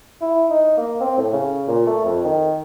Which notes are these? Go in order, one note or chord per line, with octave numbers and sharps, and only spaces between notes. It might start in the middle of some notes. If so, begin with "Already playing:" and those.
E4
D#4
A#3
C4
A2
C#3
A#2
A3
F2
D#3